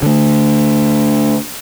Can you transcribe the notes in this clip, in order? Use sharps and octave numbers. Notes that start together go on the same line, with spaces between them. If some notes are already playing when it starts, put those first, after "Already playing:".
D3 A3